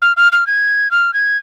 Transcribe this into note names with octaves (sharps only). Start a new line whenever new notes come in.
F6
F6
F6
G#6
F6
G#6